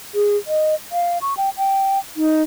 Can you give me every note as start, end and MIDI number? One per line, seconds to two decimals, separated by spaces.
0.15 0.37 68
0.47 0.75 75
0.92 1.18 77
1.22 1.36 85
1.37 1.50 79
1.58 1.99 79
2.16 2.42 63